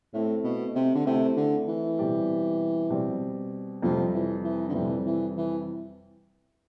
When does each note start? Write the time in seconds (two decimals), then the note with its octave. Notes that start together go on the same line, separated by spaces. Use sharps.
0.13 A2 A3 C4 E4
0.44 B2
0.75 C3
0.95 D3
1.06 C3 A3 C4 E4
1.36 D3
1.68 E3
1.99 B2 G3 C4 G4 D5
2.90 B2 G3 C4 G4 D5
3.82 F2 C3 F3 G3 C4
4.14 E3
4.44 E3
4.69 D3
4.74 F2 C3 E3 G3 C4
5.06 E3
5.37 E3